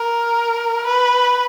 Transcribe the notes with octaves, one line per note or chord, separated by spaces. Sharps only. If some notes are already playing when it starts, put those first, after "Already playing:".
Already playing: A#4
B4